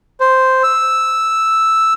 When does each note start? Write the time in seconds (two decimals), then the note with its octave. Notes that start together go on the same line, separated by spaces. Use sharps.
0.20 C5
0.63 E6